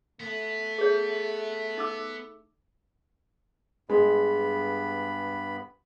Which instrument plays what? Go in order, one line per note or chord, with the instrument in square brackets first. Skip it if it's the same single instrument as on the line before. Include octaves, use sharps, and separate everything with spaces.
[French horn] A3 [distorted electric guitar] B3
[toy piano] G#4 C#5
D#4 D6 E6
[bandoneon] G2 B3 B5 [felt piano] G#3